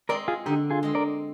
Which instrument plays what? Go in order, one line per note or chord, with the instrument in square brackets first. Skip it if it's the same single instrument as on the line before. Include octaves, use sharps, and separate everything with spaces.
[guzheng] G#3 C4 [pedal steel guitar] A#4 D5
[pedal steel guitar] F4 G#4
[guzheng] D3 [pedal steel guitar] D#4 G4
[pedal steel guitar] F4 G#4
[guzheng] G#3 C4
[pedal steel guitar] A#4 D5